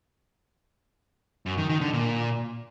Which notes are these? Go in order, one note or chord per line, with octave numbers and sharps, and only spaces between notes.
F#2
D#3
D#3
D3
A#2